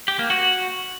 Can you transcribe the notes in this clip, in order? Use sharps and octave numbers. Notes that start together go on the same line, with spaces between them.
G4
A#3
F#4